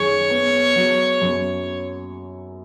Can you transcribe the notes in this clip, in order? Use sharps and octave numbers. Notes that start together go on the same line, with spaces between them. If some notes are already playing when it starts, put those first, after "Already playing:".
Already playing: F#2 D#3 G#4 C#5
B3
F#3
F#2